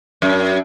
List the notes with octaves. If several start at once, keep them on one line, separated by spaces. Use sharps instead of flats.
F#2